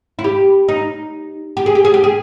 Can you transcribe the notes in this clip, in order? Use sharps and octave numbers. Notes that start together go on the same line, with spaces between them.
E4
G4
D#4
G4
G#4
G4
G#4
G4
G#4